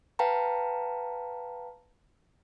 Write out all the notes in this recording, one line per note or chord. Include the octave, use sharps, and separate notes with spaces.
B4 F5 G5 A5 A#5